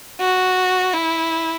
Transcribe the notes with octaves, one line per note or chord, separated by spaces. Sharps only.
F#4
E4